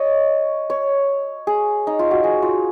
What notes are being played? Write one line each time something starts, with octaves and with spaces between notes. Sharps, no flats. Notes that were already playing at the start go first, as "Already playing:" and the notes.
Already playing: C#5 D#5
C#5
G#4
D#4
F4
F#4
G#4
F4